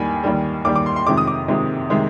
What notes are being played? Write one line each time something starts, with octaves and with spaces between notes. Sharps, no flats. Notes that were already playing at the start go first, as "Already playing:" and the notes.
Already playing: D#2 D#3 G3 G#5 B5
D#2 D#3 G3
D#2 D#3 G3 D6
D6
C6
C6
F2 C3 D#3 G#3 D6
D#6
D6
F2 C3 D#3 G#3
C3 D#3 G#3